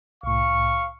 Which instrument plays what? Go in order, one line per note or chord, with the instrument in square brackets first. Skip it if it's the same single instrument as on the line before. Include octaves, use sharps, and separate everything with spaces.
[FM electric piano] C2 A2 [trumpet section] F5 C#6